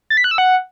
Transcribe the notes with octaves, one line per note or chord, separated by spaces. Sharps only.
A6
B6
F#6
E6
F#5